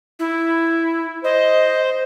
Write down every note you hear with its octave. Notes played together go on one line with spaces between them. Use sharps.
E4
C5 D#5